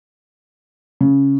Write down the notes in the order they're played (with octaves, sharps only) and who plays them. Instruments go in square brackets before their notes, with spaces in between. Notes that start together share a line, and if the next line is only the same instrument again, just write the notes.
[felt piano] C#3